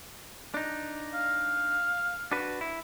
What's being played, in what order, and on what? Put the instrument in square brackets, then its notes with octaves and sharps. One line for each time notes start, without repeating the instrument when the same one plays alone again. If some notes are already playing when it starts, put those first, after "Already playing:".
[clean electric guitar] D4 D#4
[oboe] F5
[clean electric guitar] D4 F#4 B4
E4